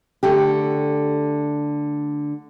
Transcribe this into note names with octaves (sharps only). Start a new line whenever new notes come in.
D3 A3 G4